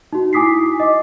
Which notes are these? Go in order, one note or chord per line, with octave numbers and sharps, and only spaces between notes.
D#4 F#4
E4 G#5 D6 D#6 B6 C7
D#5 D6